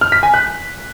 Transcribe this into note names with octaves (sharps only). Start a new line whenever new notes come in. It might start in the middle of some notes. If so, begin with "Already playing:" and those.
F6
B6
G#5
F#6